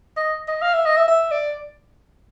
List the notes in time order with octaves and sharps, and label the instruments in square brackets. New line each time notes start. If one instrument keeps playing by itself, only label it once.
[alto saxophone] D#5
D#5
F5
E5
D#5
E5
E5
D5